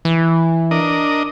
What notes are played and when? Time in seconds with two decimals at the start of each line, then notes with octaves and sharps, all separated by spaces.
0.05 E3
0.71 D4 A#4 D#5